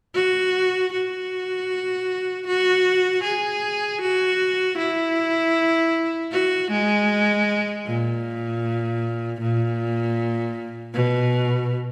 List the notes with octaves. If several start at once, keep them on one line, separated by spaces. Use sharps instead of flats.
F#4
F#4
F#4
G#4
F#4
E4
F#4
G#3
A#2
A#2
B2